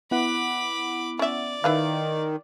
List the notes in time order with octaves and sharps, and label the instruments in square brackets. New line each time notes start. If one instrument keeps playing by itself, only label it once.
[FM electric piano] B3 E4 F#5 [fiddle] B5 D6
[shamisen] C#4 E5 [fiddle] D5
[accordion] D#3 [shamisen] E4 B4 F5